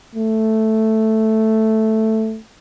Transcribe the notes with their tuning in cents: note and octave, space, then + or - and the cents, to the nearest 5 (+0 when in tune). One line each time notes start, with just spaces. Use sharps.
A3 +0